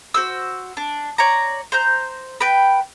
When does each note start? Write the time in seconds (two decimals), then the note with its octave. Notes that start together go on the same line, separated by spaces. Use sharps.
0.14 F#4 C5 E6
0.77 D4
1.18 C#5 D5 A#5
1.72 C5 A#5 G6
2.41 B4 G5